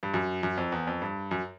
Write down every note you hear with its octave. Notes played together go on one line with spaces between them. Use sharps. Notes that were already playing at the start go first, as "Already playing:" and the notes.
G2
F#2
F#2
F2
E2
F2
G2
F#2